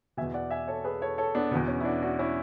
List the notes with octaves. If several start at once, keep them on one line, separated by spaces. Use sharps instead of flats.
E2 B2 E5 G#5
D5 F#5
E5 G#5
A4 C#5
G#4 B4
A4 C#5
A4 C#5
B3 D4
E2 B2 B3
C#4
E4
D4 F#4
D4 F#4
C#4 E4